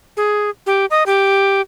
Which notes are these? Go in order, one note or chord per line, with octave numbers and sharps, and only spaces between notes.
G#4
G4
D#5
G4